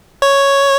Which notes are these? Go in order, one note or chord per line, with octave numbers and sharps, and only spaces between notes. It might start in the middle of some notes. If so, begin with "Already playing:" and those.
C#5